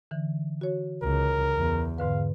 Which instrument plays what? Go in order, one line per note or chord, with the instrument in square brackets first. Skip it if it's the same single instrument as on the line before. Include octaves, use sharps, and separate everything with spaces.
[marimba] D3 E3
F#4 C#5
[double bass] C#2 [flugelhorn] A#4
[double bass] E2
[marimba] G#2 D3 B4 [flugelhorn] F5